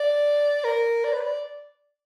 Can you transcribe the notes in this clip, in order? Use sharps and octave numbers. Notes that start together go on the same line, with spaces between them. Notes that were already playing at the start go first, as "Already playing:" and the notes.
Already playing: D5
A#4
D5
B4
D5